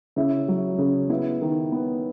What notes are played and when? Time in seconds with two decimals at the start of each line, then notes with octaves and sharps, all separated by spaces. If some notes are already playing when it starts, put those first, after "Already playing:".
0.16 C#3 E4 E5
0.48 F#3
0.78 C#3
1.09 B3 E4 E5
1.42 D#3
1.72 B3